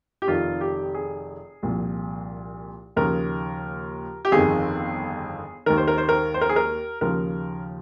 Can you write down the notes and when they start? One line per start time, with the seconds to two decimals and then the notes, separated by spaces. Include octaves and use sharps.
0.22 G4
0.27 F1 F2 D#3 F4
0.61 G4
0.94 G#4
1.63 C2 A#2 F3
2.97 D#2 C#3 F3 A#4
4.25 G4
4.32 G1 F2 D#3 G#4
5.66 D#2 D#3 A#4
5.77 C5
5.88 A#4
5.98 C5
6.09 A#4
6.34 C5
6.41 A#4
6.49 G#4
6.56 A#4
7.01 D#2 C#3 F3 A#4